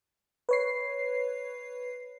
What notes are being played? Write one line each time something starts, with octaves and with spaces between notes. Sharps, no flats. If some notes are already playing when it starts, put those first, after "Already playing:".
B4 C#5 C7